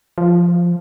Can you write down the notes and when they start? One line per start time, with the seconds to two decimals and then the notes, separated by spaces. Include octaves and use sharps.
0.18 F3